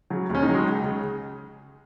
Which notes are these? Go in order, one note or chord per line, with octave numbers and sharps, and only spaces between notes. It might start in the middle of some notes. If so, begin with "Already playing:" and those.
C#3 F#3
D#2
C#4
D#4
C#3 F#3
G#3
C#2
C#3